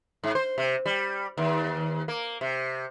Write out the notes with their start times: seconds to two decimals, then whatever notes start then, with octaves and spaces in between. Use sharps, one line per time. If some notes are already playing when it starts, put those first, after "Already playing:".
0.23 G#2
0.35 C5
0.58 C3
0.86 G3
1.37 D#2
2.08 A#3
2.41 C3